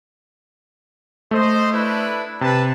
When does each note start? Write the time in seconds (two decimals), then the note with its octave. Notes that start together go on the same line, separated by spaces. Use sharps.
1.31 A3 C5 D#5
1.72 D4 E4 B4
2.41 C3 B4 A5